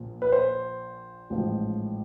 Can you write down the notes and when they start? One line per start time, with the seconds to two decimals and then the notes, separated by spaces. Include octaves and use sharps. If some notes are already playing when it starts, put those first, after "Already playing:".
Already playing: A#1 A#2 F3
0.22 B4
0.32 C5
1.30 A1 G#2 F3